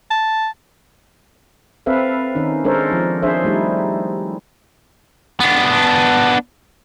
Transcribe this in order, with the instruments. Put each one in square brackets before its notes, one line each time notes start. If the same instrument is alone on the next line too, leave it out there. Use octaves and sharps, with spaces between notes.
[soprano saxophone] A5
[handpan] C4 A4 B4 E5 F5
D#3 C#4 D#4
G#3 D4 A4 A#4 C5 C#5
F3
D4 G#4 C5 C#5 E5
G3 A3 D#4 E4
[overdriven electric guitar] B3 D4